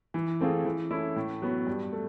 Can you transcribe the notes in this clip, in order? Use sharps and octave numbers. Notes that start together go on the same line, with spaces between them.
E3
A3 C4 F4 G#4
E3
A3 C#4 E4
A2
F#3 B3
G2
A3